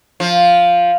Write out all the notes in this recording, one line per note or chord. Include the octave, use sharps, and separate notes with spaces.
F3